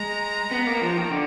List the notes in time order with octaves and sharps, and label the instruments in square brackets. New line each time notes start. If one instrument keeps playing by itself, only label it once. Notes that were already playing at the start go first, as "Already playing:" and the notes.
Already playing: [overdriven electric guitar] G#3 [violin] A#5
[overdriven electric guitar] B3
A#3
F3
D#3
D3